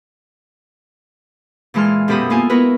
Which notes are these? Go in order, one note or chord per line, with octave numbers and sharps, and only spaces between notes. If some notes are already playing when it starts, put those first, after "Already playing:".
A#2 E3 G#3 A5 C6 F6
F#2 B2 G4 A4 B5 D#6
A#3 B3 F4 A4 G#5
B3 E4 F#4 A#4 B4